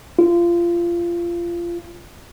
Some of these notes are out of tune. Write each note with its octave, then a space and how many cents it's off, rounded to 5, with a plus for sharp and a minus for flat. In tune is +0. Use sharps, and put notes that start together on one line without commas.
F4 -25